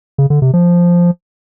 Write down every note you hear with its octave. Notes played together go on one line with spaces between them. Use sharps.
C#3
D3
C3
F3